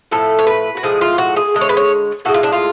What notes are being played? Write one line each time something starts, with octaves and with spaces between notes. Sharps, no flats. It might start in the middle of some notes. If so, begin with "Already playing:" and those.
A2 F3 A3 A4
C#5
B4
F#4
A2 F3 G#3 G#4
F4
F#4
G#4
D3 G#3
C#5
B4
C#5
A2 G#3 F#4
F4
D4
F4